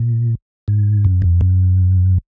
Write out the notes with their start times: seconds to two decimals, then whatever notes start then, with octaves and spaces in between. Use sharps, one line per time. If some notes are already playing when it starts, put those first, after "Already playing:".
Already playing: A#2
0.68 G#2
1.05 F#2
1.22 F2
1.41 F#2